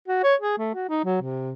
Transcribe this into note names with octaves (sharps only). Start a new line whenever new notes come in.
F#4
C#5
G#4
A3
F#4
D#4
F#3
C3